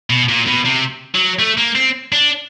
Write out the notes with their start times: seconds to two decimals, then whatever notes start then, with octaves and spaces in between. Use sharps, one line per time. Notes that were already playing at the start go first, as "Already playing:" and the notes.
0.10 B2
0.29 A#2
0.46 B2
0.65 C3
1.15 F#3
1.39 A3
1.58 A#3
1.76 C4
2.12 D4